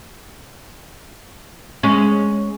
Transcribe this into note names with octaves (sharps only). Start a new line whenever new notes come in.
G#3 C#4